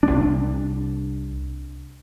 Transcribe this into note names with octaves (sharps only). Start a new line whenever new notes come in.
C2 D4